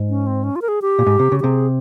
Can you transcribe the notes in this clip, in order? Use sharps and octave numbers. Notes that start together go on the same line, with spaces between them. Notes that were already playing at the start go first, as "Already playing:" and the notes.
Already playing: G#2
C#4
C4
C#4
F4
A#4
G#4
G4
A#2
G#2
C3
C#3
G4
C3 G#4